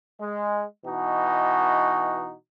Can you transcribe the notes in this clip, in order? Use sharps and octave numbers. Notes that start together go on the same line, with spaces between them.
G#3
B2 E3 D#4 F#4